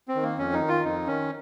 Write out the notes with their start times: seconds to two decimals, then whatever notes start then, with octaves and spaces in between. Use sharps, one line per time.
0.08 C4
0.15 D#3
0.23 A#3
0.38 F2 C#4
0.53 D#4
0.60 D#3
0.68 F4
0.84 F2 D#4
1.07 D#3 C#4